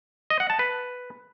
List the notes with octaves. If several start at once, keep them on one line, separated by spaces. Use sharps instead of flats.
D#5
F#5
A5
B4